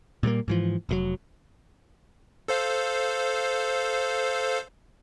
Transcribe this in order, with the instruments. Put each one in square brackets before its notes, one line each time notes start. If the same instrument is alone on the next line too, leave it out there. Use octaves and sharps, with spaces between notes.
[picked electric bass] A#2 G3 A3 A#3
G#2 E3 F3
F1 A#2 F#3
[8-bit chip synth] A4 C5 F5